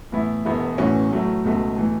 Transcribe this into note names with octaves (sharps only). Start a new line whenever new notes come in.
A2 E3 B3 E4
E1 E2 B2 B3 E4
A1 A2 E3 C#4 F#4
A2 F#3 A3 F#4
C#2 B2 A3 F#4
A2 E3 A3